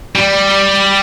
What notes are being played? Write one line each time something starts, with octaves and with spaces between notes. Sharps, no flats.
G3